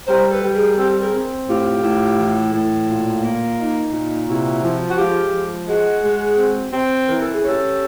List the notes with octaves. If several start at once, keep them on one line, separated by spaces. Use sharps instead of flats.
G3 A#4 C5
A4 B4
G3
G#4 A#4
C4 G4 A4
G#4 A#4
C4
A2 F4 G4
A2
E3
A2
A#2 F4
A#3
D#4
A#2
C3 E4 F#4
F3
F#4
G#3 F4 G4
F3
G#3 F#4 G#4
G#3
C4
C4
E3 A#4
A4
G#4
C#4
G4 A4